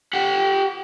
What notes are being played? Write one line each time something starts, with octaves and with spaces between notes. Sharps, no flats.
G4 F#5